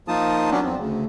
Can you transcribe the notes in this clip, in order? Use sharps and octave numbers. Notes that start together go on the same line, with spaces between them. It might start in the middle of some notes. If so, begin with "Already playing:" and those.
F3 A#3 D#4 F4 A5 D#6
F#3 B3 C#4 D4
F2 C4
D2 C#3